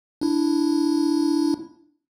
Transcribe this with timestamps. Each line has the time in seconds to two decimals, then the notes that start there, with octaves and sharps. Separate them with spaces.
0.21 D4 E4